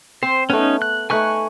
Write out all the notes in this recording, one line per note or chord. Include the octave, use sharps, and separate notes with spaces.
C4 C5
A3 B3 C#4 D#4
F#6
A3 D#4 B4 G#5 C#6 F#6